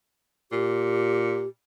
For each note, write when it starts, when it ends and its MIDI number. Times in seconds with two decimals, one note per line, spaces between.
0.52 1.45 46
0.52 1.48 67